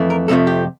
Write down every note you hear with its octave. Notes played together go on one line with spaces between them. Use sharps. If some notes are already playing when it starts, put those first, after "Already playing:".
Already playing: F2 E3 A3
A#4
F2 C3 F3 A3 A4
G4